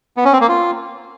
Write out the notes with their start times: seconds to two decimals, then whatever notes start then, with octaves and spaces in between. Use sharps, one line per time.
0.17 B3
0.25 C#4
0.33 C4
0.41 A#3
0.49 F4